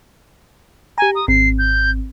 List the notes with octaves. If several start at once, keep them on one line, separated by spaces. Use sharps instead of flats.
G4 G#5 A#5
D#6
G#1 C4 C7
G6